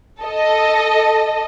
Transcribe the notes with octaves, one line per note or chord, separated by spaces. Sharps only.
A4 D#5